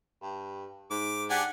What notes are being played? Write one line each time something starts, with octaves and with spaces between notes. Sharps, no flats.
G2
G#2 D6
D4 G4 F#5 G#5